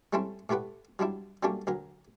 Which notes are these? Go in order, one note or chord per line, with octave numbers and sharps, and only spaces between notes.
G3 A3 C4 C#4 E4
A2 A3 G4 B4 F#5
F#3 G3 D4 E4
F#3 G3 A3 A#3 C#4 D4
D2 F#3 A#4